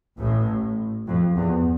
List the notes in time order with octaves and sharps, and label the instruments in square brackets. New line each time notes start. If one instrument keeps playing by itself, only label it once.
[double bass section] A1 A2
F2
E2